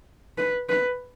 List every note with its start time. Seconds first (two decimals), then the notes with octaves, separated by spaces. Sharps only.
0.38 B4
0.69 B4